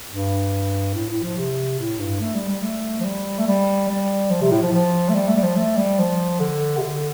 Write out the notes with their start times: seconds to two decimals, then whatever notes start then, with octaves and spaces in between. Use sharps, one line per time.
0.11 G2
0.95 A2
1.09 A2
1.23 F3
1.37 C3
1.79 A2
2.00 G2
2.20 A3
2.35 G3
2.49 G3
2.63 A3
3.00 F3
3.04 G3
3.39 A3
3.46 G3
3.89 G3
4.30 F3
4.41 C3
4.51 A2
4.62 F3
4.73 F3
5.09 A3
5.15 G3
5.28 A3
5.36 G3
5.43 F3
5.56 A3
5.77 G3
5.98 F3
6.40 D3
6.77 C3
6.82 D3